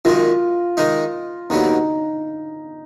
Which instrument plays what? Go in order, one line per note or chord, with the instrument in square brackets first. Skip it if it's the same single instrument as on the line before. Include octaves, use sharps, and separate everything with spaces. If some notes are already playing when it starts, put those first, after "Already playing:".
[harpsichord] F#2 D#3 G#3 [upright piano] F4
[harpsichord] D#3 G#3 D#4
[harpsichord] D#2 D3 F#3 B3 [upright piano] D#4
[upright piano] D#4